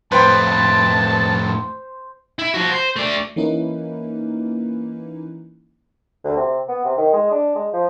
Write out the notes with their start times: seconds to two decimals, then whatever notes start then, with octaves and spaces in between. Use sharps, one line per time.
0.12 F2 A2 B4 C5 G5 A5
2.39 E4
2.54 F3 F#4
2.72 C5
2.96 A3 D5
3.36 E3 A#3 C#4 D#4 E4 B4
6.24 D2
6.36 C3
6.69 B3
6.85 C3
6.97 D#3
7.13 G#3
7.31 D4
7.55 G#3
7.73 F3